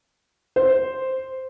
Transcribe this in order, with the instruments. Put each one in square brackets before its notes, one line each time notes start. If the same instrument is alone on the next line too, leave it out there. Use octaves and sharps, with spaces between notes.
[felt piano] C5